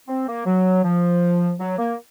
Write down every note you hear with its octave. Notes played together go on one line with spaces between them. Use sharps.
C4
A#3
F#3
F3
F#3
A#3